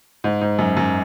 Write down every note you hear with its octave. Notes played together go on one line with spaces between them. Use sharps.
G#2
G#2
F#2
F#2